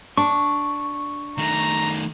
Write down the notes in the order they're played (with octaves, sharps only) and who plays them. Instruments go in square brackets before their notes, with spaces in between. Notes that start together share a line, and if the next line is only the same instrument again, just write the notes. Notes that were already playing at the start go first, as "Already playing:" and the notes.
[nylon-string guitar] D4 [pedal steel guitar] C#6
[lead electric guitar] D#3 A3 [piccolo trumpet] A#5